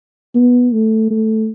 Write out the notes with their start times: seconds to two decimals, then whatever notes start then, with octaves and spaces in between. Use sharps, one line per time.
0.35 B3
0.73 A3
1.10 A3